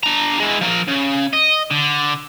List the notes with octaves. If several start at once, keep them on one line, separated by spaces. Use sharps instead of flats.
D4 A#5
G#3 E4
F3 A#4
C#3
D#5
D3